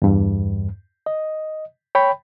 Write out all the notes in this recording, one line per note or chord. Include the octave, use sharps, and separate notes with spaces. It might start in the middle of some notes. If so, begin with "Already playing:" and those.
E2 G2
D#5
C#5 G5 B5